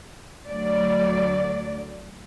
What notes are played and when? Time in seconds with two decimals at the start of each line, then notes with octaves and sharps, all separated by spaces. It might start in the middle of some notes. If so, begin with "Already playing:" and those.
0.49 D2 F#3 D5